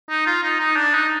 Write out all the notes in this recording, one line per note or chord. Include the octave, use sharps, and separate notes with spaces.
D#4
F4
D#4
D#4
D4
D#4